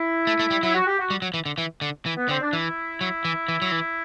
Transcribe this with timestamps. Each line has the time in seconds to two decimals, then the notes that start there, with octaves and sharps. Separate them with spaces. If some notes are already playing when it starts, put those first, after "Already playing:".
Already playing: E4
0.27 A3
0.39 A3
0.51 G3
0.63 F#3 E4
0.75 F#4
0.87 G4
0.99 F#4
1.10 G3
1.22 F#3
1.34 E3
1.46 D3
1.58 E3
1.81 D3
2.06 E3
2.17 B3
2.29 D3 C4
2.41 D4
2.53 E3 E4
3.01 F#3
3.25 E3
3.48 E3
3.62 F#3
3.72 E3